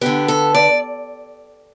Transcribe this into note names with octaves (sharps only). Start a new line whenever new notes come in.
D3 B3 G4
A4
D5